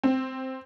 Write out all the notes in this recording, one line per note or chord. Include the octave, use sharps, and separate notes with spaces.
C4